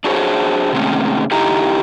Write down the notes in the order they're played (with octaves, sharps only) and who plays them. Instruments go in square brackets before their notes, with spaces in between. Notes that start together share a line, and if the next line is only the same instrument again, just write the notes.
[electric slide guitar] D4 F#4 G#4 C5 C#5
C3 D#3 G#3 A3 C4 C#4
D3 D#4 E4 G4 D#5 A#5